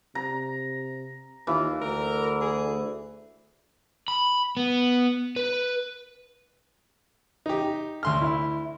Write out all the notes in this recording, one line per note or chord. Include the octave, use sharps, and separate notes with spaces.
C3 A#5
D#2 E3 F4
D2 A#4
G#4
B5
B3
B4
D#4 G4
D2 C6 F6
E4 E5